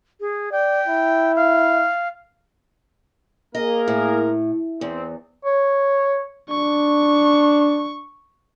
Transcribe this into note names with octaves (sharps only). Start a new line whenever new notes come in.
G#4
D5 G5
E4
F5
A#3 G#4 A#4 D#5
A2
E2 C4
C#5
D4 C#6